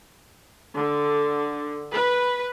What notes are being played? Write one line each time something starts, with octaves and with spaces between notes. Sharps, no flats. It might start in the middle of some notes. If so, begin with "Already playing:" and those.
D3
B4